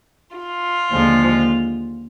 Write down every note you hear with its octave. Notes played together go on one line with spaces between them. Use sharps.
F4
D#2 D3 F3 G#3